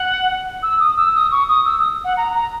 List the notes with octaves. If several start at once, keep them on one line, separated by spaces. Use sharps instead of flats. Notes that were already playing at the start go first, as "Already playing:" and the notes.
Already playing: F#5
E6
D#6
E6
D#6
C#6
D#6
E6
D#6
F#5
A#5
A#5